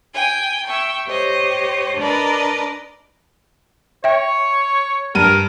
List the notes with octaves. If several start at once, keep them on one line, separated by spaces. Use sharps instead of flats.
G5 G#5
E5 G5 C#6
G4 C5 C#5 D#5
D4 A#4 B4 D5 D#5
C#5 E5 G5
G2 A#4 D#7